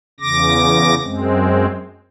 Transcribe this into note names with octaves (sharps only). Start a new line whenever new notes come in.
E2 C#3 D6 A#6
F#2 G#3 C4